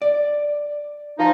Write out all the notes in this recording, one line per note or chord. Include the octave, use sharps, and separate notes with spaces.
D5
F3 D#4